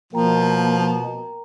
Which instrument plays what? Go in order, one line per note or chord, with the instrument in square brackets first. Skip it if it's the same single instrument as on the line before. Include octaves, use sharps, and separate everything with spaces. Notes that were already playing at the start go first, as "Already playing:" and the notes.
[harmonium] B2 [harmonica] F3 [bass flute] A#3 [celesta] A#4 G5 A#5